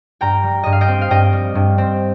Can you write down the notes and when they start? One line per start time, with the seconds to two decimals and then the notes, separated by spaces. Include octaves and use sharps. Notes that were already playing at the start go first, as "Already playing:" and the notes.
0.21 G2 G5 A#5
0.43 G3
0.63 G2 D#5
0.72 F5
0.81 D#5 G5
0.88 C4
1.01 F5
1.10 G2 D#5 G5
1.33 G3
1.55 G2
1.78 C4